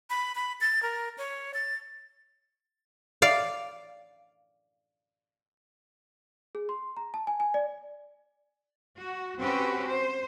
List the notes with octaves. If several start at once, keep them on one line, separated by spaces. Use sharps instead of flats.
B5
B5
A6
A#4
C#5
A6
D5 F5
G#4
C6
A#5
A5
G#5
G#5
D5
F#4
C4 C#4 F#4 G4 B4
C5